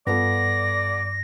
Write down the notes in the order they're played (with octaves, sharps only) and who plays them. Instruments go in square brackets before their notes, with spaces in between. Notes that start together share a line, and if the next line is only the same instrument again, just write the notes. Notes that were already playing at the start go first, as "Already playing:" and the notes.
[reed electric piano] G2 [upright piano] B3 F4 A4 [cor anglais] D5 [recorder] A#6